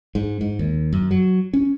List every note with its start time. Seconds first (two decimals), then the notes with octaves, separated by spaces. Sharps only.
0.15 G#2
0.41 G#2
0.59 D#2
0.93 F#2
1.11 F#3
1.53 C#4